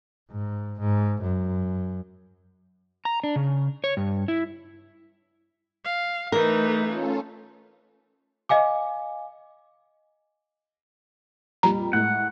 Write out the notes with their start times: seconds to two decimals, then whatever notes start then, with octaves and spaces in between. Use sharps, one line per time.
0.31 G#2
0.80 G#2
1.22 F#2
3.05 A#5
3.24 D4
3.36 C#3
3.84 C#5
3.97 G2
4.28 E4
5.84 F5
6.32 E3 A3 D#4 A#4
6.84 C#4 F4 A4
8.49 D#5 F5 G#5 D6
11.63 F2 A#2 G3 A#5
11.93 A2 G#3 F#5